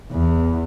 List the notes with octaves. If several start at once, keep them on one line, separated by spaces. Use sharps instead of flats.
E2